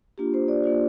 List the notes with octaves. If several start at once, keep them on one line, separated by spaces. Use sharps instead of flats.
A#3 D4 F4 G4
C5
D5
A#3 D4 F4 D5